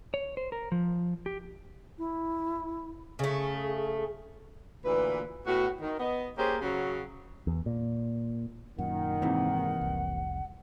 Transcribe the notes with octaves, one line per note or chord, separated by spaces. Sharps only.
C#5
C5
A#4
F3
G4
E4
C#3 A3 G#4
D2 A#2 E3 B4
A2 B3 F#4
D#3
B3 D#5
A#3 C#4 G4 G#4 C5
C#3 F#3 F#4
E2
A#2
F#2 A#2 D#3 F#5
G#2 C3 E3 A#3
F1 C2